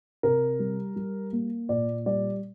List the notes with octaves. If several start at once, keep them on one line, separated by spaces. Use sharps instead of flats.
C3 A#4
G3
G3
A#3
A#2 D5
G3 D5